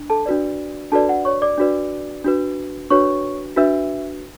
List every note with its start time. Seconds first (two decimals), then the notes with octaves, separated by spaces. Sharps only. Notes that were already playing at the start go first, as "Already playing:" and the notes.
Already playing: D4
0.10 A4 A5
0.26 D4 F#4 B4 D5
0.92 D4 F#4 A4 B4 D5 A5
1.09 F#5
1.25 C#5 C#6
1.42 D5 D6
1.58 D4 F#4 B4 D5
2.24 D4 F#4 B4
2.90 D4 F#4 B4 C#5 C#6
3.56 D4 F#4 B4 E5 E6